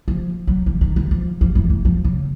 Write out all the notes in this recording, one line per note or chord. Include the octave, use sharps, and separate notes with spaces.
F3
F#3
E3
D#3
E3
F3
F3
E3
E3
F3
C#3